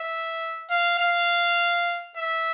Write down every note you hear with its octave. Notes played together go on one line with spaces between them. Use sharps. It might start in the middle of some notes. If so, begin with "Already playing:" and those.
Already playing: E5
F5
F5
E5